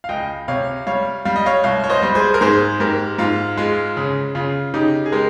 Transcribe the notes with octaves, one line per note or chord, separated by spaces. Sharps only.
F5
C#2 D#5 G5
C3 C#5 F5
G3 C#5 F5
G3 F5
D#5
C#5 F5
C2 C#5 F5
C#5
C5 D#5
G3
G#4 C5
A#4
G#2 G#4 C5
G#2 G4 A#4
G#2 F4
G#3 F4
C#3
C#3 F4
C#3 D#4 G4
G#4
G#3 G4 A#4